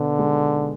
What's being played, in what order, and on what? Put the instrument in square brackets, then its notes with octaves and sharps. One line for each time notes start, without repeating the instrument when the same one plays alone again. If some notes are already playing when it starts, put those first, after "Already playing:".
Already playing: [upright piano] B2 B3 [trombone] D3
[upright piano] G#3